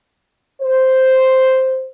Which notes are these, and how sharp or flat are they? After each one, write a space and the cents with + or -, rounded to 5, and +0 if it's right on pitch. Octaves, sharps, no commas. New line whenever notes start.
C5 +0